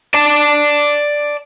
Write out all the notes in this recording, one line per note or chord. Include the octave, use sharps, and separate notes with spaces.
D5 A5